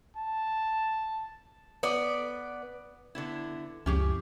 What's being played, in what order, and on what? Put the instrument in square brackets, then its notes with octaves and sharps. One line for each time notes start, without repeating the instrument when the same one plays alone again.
[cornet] A5
[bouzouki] B3 D5
[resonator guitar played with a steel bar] D3 B3 E4
[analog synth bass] C#2 [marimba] F#2 F3 [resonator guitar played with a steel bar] C#4 G4 G#4